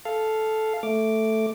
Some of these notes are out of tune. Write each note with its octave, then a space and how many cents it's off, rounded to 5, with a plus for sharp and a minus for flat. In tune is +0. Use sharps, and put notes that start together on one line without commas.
A4 -10 F5 -5
A3 +0 D6 +0